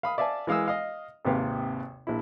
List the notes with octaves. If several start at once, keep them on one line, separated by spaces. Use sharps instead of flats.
F5 B5 D#6
D5 E5 F5 G#5 A5
E3 G#3 F5 D#6 E6
D#5 F5 D#6
G#1 D#2 C3 B4 F5
A#1 E4